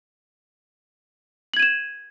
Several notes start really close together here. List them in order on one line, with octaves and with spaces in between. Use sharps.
F#7 G#6 D#7 E7